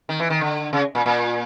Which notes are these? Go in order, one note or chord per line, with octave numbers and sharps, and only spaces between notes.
D#3
E3
D#3
D3
C#3
A#2
A#2